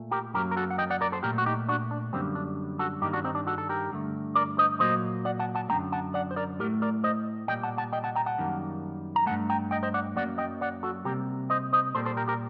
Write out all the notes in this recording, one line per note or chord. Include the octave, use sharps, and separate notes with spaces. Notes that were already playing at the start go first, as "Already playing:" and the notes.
Already playing: A#2 A3
G4 A#4
F#2 F#3 A#3 G4 A#4
A#4
F#4 A4
F#5
D#5 G5
D5 F#5
A#4 D5
A4 C5
A#2 A3 G4 A#4
F#4
D#4 G4
D4 F#4
D4
F#2 D3 G3 A#3 C4
D4
F#4 A4
G2 D#3 G3 A#3 D#4 G4
D4 F#4
C4 D#4
D4
F#4 A4
A4
G4 A#4
G2 D3 A3
A#4 D5
C5 D#5
A#2 F#3 A#3 C5 D#5
D5 F#5
F#5 A5
F#5 A5
F#2 D3 A3 G5 A#5
F#5 A5
D5 F#5
C5
A#4 D5
A2 A3 G4 A#4
A#4 D5
C5 D#5
A#2 G3 A#3 D#5 G5
F#5 A5
F#5 A5
D#5 G5
F#5 A5
G5 A#5
F#5 A5
F#2 D#3 G3 A#3
A#5
G2 F#3 A3 F#5 A5
G5 A#5
D#5 G5
C5 D#5
D5 F#5
F#2 F#3 A#3 D5 F#5
D#5 G5
D5 F#5
F#4 A4
C3 G3 A#3 G4 A#4
C5 D#5
C5 D#5
A#2 G3 A#3 A4 C5
A4 C5
G4 A#4
G4 A#4